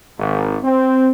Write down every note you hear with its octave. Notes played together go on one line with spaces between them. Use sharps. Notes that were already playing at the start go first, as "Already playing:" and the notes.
G#1
C4